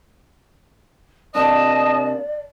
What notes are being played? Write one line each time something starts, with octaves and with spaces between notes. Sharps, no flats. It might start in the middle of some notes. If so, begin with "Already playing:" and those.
C3 A#3 D4 D5 D#5 A5